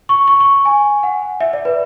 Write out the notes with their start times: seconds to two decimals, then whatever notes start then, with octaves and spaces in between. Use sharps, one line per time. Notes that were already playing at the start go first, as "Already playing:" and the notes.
0.09 C#6
0.28 C#6
0.40 C#6
0.65 G#5
1.03 F#5
1.40 E5
1.53 D5
1.65 B4